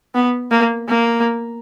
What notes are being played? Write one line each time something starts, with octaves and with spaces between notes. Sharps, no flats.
B3
A#3
A#3